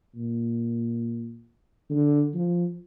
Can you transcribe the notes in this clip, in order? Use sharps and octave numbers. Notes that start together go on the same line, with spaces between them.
A#2
D3
F3